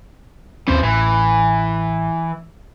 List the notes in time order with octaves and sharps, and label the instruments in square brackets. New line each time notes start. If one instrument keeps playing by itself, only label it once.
[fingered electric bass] D#2 C4 C#4 [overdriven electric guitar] E3 C5
[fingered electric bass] A1 [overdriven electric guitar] E3